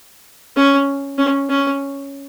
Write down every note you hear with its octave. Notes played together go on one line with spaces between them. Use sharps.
C#4
C#4
C#4